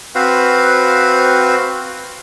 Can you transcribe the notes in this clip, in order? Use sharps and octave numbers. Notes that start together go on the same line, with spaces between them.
C4 F#4 B4 C5 F5